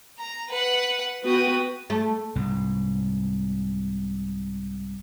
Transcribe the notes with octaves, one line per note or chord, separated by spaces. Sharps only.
A#5
B4 F#5
B3 F#4 B4 G5 D#6
A3
C2 G#2